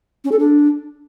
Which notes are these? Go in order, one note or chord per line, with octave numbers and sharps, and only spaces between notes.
C#4
A4
D4